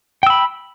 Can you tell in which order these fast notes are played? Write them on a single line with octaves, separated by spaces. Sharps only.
G5 E6 B5